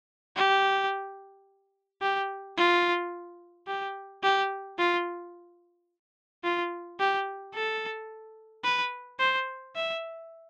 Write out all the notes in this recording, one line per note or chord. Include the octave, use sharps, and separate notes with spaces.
G4
G4
F4
G4
G4
F4
F4
G4
A4
B4
C5
E5